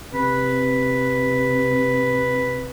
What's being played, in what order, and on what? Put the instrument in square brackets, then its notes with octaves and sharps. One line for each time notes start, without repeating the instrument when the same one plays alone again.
[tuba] C3 [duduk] B4